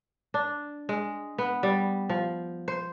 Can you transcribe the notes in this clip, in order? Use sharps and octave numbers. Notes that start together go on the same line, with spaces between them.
D4
G#3
B3
G3
F3
C5